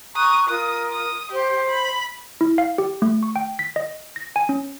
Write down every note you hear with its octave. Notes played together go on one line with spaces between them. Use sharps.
A#5 C#6 D#6 F#6
F4 A#4 D#6
D#6
G4 C5
B5
E4
F5
G4
A3
C#6
G5
B6
D#5
A#6
G#5
C#4